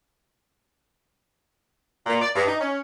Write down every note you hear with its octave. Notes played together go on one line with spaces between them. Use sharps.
A#2
D5
G2
D#4
C#4